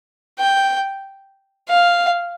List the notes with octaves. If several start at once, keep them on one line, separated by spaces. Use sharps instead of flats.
G5
F5